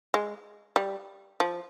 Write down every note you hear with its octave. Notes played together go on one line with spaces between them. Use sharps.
G#3
G3
F3